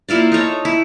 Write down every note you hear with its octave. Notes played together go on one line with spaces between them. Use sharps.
A#3 E4 F4 D5
D#4 A4 C#5 A#5
E4